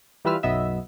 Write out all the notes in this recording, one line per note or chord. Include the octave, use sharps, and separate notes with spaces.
E3 G3 F4 B4 E6 F6
B1 F#2 B3 D#5 E5 E6